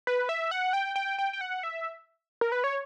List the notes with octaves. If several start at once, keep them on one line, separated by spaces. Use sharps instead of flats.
B4
E5
F#5
G5
G5
G5
G5
F#5
E5
A#4
B4
C#5